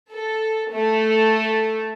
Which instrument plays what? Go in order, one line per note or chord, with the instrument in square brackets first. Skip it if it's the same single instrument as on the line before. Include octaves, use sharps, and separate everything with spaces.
[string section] A4
A3